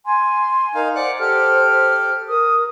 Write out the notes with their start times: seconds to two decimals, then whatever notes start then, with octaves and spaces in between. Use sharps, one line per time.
0.06 G#5 C6
0.75 D#4 A#4 F5
0.96 C5 D5 F#5 F#6
1.20 G4 A4 F6
2.29 A#4 D#6